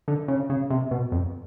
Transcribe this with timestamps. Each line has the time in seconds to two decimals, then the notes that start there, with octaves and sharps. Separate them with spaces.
0.08 D3
0.28 C#3
0.50 C#3
0.70 C3
0.91 B2
1.12 F2